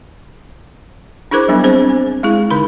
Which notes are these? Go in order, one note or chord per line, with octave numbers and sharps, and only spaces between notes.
D4 E4 G#4 A#4 C5 D6
F#3 G3 B3 D4
C4 D4 G#4 C5
G#5
G#3 E4 G#4
D3 D#4 B5